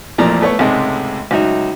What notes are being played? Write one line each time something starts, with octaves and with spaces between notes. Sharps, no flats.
A1 F2 A#2 F3 D5 A#5
A3 B3 C#5 C#6
C#2 G#2 C3 G#3 A3
C#2 F#3 D#4 E5